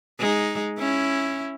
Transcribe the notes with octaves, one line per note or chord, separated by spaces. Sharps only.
G#3 D#4
C#4 E4